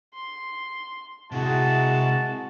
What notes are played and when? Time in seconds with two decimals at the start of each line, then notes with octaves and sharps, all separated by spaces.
0.14 C6
1.32 C3 G#3 E4 F#4 A5